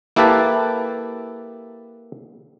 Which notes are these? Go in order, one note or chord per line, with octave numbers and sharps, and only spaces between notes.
A#3 E4 G4 A4 B4 A5